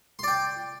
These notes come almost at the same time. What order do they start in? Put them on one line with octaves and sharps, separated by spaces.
C6 D5 G5